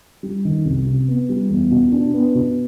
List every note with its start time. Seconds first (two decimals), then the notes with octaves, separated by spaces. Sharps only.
0.23 G3
0.45 D#3
0.65 C2
0.87 C3
1.08 B3
1.29 G3
1.50 E2
1.71 B2
1.92 D4
2.14 B3
2.35 B2